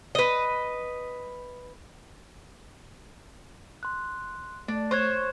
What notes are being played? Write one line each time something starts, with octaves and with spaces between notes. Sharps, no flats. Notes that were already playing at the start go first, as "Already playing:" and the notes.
B4 D#5
C6 F#6
A3 D4
C5 C#5 C#6 F#6 G#6